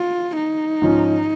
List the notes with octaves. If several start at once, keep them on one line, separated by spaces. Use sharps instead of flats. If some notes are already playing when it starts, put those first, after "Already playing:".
Already playing: F4
D#4
G#2 F3 C#4